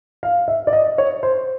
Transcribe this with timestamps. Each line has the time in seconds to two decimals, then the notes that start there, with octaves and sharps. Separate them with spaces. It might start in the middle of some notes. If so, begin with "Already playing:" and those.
0.23 F5
0.48 E5
0.67 D5
0.73 D#5
0.98 C#5
1.23 C5